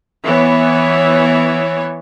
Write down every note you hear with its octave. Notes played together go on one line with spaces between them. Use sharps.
E3 B3 C#5